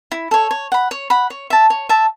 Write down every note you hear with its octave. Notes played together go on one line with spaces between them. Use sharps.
E4
A4 C#5
C#5
F#5 B5
C#5
F#5 B5
C#5
E5 A5
C#5
E5 A5